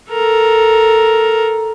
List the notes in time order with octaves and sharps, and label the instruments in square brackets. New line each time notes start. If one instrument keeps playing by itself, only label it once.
[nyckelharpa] A4 A#4